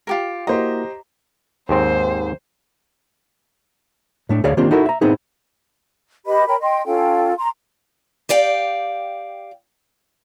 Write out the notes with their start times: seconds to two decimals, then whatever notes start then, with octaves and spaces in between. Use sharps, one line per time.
0.07 F4 G4 A#4
0.47 A#3 E4 F#4 G4 C5 D#5 A#5
1.69 D#2 G#2 C4 C5
4.29 A2 A3 D4
4.44 D2 G#4 C#5 D5 F5
4.57 D#3 A#3 C4 D4 F4 G4
4.71 D#4 E4 F#4 A4 A#4
4.86 E5 A#5
5.01 A2 A3 B3 C4 D#4 G#4
6.25 G4 B4 D#5 B5
6.48 A#4 C#5 G5 B5
6.60 D#5 G5 C6
6.85 C#4 F4 A4 G5
7.37 A#5 C6
8.29 G4 D5 F5 G5